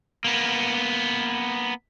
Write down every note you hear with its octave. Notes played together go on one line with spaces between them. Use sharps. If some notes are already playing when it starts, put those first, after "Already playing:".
A#3 B3